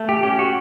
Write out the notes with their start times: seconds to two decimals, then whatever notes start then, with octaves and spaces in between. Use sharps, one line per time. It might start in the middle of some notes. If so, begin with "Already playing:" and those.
Already playing: A3
0.09 G4
0.23 C#4 G4
0.39 F#4